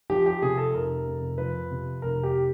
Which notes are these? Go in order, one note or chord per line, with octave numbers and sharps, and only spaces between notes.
F3 G4
G4
C3 G#4
A4
F1 A#4
F2
F3 B4
C3
F1 A#4
G4